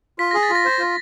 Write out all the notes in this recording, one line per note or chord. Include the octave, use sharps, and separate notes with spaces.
F4 B6
G#4 A#6
A6
F4
A#6
C5
F4